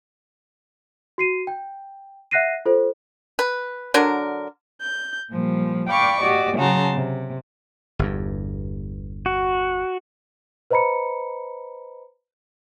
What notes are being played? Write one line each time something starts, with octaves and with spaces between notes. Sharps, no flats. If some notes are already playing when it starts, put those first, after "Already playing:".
F#4 C7 D#7
G5
E5 F#5 F#6 A#6 C7 D#7
F4 A4 C5
B4
D3 F#3 D4 A#4
G6
A#2 F3 G3
D5 F5 G5 B5 C#6 D6
F#4 G4 D5 D#5
C#3 F#3 F#4 A5 A#5 C6
C3
G1 E2 G2
F#4
B4 C5 D#5 A#5 B5 C#7